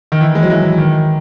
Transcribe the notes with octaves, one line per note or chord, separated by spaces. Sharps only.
D#3
E3
G#3
F#3
E3
D#3